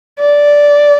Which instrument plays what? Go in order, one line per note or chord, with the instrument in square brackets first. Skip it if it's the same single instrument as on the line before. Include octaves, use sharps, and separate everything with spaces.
[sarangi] D5